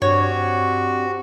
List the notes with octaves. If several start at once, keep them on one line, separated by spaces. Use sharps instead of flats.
G2 C4 D4 F#4 G4 C#5